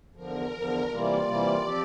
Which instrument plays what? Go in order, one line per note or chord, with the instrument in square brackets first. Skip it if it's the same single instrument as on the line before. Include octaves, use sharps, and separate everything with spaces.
[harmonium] E2 D3 F3 [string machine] A#4
[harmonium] E2 D3 F3
[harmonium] C3 E3 G3 A#3 F4 [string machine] D5
[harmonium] C3 E3 G3 A#3 F4
F3 C4 G4